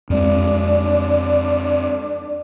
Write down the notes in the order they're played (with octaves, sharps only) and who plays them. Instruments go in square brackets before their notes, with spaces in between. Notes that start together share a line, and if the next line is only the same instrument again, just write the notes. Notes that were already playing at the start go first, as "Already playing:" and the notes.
[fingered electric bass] F2 G#3 [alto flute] D4